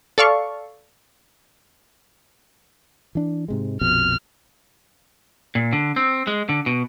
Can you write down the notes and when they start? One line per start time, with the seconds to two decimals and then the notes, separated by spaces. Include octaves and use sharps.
0.18 A4 D5 F5 C#6
3.15 E3 D4
3.48 G#2 C3 G#3
3.81 A#1 F2 B2 F6
5.55 A#2
5.73 D3
5.96 C4
6.27 G#3
6.49 D3
6.66 B2